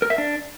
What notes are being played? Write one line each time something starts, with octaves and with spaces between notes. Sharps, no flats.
A#4
E5
D4